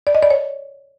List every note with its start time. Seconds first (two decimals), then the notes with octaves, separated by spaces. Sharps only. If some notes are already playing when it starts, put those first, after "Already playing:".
0.07 D5
0.15 D#5
0.23 D5
0.30 C#5